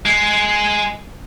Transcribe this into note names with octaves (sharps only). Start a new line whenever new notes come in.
G#3